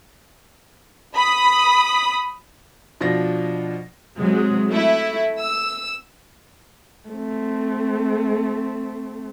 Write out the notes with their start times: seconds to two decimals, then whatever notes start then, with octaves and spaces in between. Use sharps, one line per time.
1.16 B5 D#6
3.01 B2 F3 D4 A#6
4.18 C3 F#3 G#3
4.70 A3 E4
5.37 E6
7.09 A3 C4